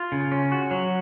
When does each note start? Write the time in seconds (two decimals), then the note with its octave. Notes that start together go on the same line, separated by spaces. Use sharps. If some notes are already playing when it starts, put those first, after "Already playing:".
Already playing: F4
0.12 C#3
0.32 C#4
0.52 F#4
0.71 F#3